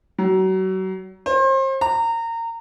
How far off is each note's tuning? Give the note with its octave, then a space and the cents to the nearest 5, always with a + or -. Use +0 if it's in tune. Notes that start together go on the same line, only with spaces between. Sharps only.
F#3 +30
C5 +35
A#5 -25